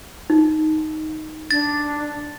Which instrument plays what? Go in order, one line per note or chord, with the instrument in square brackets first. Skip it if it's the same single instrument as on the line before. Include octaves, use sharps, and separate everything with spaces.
[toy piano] D#4
[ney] D4 [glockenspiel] A6